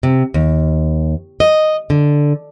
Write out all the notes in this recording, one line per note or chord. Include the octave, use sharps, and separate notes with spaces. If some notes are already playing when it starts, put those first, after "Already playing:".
C3
D#2
D#5
D3